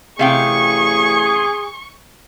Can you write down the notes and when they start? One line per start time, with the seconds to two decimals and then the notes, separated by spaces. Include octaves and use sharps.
0.19 A1 C3 G#4 F5 G5 C#6